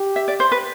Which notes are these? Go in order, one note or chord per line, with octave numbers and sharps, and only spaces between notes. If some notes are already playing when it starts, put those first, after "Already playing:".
Already playing: G4
E5
D5
C5
B4